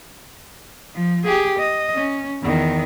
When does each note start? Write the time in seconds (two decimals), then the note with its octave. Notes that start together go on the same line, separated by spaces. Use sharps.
0.95 F3
1.24 G4 G#4
1.59 D#5
1.94 C#4
2.43 E2 D#3